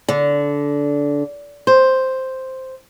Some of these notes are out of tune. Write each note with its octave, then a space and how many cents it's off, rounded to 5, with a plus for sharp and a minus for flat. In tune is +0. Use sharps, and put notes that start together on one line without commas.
D3 -20
C5 +0